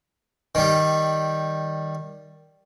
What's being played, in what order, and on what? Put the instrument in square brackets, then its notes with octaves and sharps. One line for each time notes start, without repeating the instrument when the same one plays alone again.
[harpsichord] D#3 G3